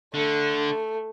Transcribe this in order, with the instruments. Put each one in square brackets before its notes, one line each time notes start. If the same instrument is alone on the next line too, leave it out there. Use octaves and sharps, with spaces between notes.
[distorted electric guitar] D3 [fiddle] A3